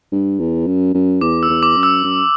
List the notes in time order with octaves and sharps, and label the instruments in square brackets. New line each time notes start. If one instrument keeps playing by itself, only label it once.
[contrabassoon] G2
E2
F#2
F#2
[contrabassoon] E2 [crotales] D6
[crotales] E6
[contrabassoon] E2
[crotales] D6
[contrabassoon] F#2
[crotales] E6
[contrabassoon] F#2